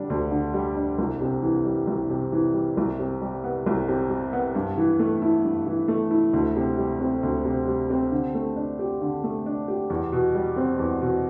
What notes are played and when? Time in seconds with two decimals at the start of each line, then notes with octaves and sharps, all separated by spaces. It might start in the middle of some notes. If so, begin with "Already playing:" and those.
Already playing: D3 G3 D4
0.10 D2
0.31 D3
0.54 G3
0.76 D4
0.99 C2
1.21 C3
1.43 E3
1.65 G3
1.87 C2
2.10 C3
2.32 E3
2.54 G3
2.77 C2
2.99 C3
3.21 G3
3.44 B3
3.66 C2
3.88 C3
4.10 G3
4.33 B3
4.55 G2
4.77 E3
4.99 A3
5.22 E4
5.44 G2
5.67 E3
5.88 A3
6.11 E4
6.33 D2
6.56 C3
6.78 G3
7.00 C4
7.23 D2
7.45 C3
7.67 G3
7.90 C4
8.11 D3
8.35 A3
8.56 D4
8.79 G4
9.01 D3
9.24 A3
9.46 D4
9.68 G4
9.90 E2
10.12 B2
10.35 G3
10.56 C4
10.79 E2
11.01 B2